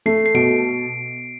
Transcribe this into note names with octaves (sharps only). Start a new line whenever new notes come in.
A3 C7
C7
B2 D7